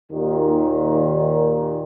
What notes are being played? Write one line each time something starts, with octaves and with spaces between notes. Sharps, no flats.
D#2 A#2 D#3